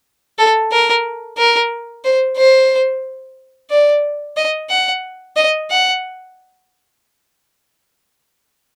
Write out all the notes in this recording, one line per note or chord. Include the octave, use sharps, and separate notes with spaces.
A4
A#4
A#4
C5
C5
D5
D#5
F#5
D#5
F#5